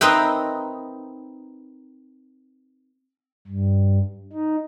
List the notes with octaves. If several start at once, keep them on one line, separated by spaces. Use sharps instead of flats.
C4 D#4 A#4 B4 E5 G5
G2
D#4